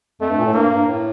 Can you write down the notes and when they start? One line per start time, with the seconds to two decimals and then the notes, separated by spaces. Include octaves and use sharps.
0.21 F2 A3
0.29 G2
0.38 A#2
0.46 A2
0.54 G2 A#3
0.71 G2
0.87 A2